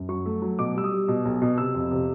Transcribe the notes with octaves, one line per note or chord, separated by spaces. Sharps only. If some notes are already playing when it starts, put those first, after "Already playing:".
Already playing: F#2
F#3 C#6
A3
F#3
B2 D6
G3 E6
D#6
G3
B2
B1
B2
C3 E6
F2
C3